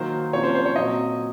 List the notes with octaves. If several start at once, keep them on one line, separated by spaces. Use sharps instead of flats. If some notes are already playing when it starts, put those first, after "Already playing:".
Already playing: D#3 F#3 A#3 C5
C3 F3 A#3 C#4 C#5
C5
C5
C#5
A#2 F#3 C4 D#5